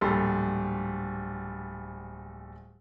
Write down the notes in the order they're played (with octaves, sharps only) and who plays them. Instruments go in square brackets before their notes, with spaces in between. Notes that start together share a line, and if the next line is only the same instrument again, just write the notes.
[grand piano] D1 A#1 G3 A4 C6